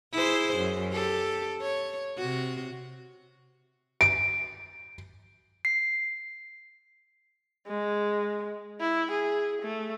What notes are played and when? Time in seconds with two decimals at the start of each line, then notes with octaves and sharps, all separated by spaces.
0.13 E4 G#4 C5
0.57 F#2
0.92 G4 A4
1.61 C#5
2.17 C3 F#4
4.01 D7
5.65 C7
7.67 G#3
8.80 E4
9.11 G#4
9.62 A3